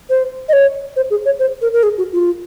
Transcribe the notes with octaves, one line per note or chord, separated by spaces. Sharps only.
C5
D#5
C#5
C5
G#4
C#5
C5
A#4
A#4
G#4
F#4
F4